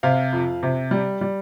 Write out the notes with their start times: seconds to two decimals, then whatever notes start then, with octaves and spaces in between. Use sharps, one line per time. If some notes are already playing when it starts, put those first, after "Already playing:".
0.03 C3 F5
0.33 F2
0.63 C3
0.91 G3
1.21 G3